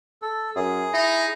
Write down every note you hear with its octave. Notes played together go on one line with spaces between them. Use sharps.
A4
F#2 G#4
D#4 E4